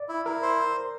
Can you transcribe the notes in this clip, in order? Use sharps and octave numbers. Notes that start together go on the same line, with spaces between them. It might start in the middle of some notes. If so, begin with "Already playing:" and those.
Already playing: D5
E4
E4 A#4
C5